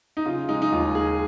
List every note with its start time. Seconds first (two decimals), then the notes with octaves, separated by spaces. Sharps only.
0.17 D#4
0.26 C#3 F4
0.49 G#3 D#4
0.62 D#4
0.72 D#2 F4
0.95 D#2 G#4